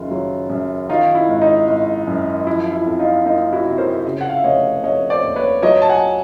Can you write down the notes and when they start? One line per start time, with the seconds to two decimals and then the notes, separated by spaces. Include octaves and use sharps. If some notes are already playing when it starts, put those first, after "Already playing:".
Already playing: F#1 D#3 F4
0.11 F#3
0.50 F#2
0.89 D#3 D#4 F4
1.15 E4
1.29 G#1
1.42 D#4
1.68 G#1
2.07 F#2
2.46 F3 E4
2.73 E4
2.86 F2
2.99 D#4 F4
3.25 A#3 D#4 F4
3.53 E4 F#4
3.65 C3
3.78 A#4 C5
4.05 C#3
4.21 F#5
4.29 F5
4.37 E5
4.44 F1 C#5 D#5
4.84 F1 C#5 D#5
5.10 C5 D5
5.23 D#2
5.36 B4 C#5
5.62 F#3 C#5 D#5
5.82 A5
5.89 F#5 G#5